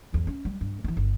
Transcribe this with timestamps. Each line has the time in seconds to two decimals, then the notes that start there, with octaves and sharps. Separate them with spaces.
0.13 G#1 E2
0.27 C#4
0.45 G3
0.61 G2
0.84 E3 B3
0.97 G1